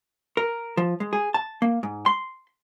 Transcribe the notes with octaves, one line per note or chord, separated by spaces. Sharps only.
A#4
F3
G#3
G#4
A5
A#3
G#2
C6